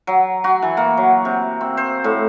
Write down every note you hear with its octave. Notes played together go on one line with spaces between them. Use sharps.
F#3
F#4
E3
A#3
F#3
C3
C4
C5
A2